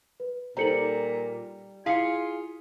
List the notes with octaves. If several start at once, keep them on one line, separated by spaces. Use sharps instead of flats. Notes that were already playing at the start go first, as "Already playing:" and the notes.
B4
A#2 G3 D#4 A4 C5 A#5 C#7 F#7
E4 F4 G#4 F5 G#5 B6 C#7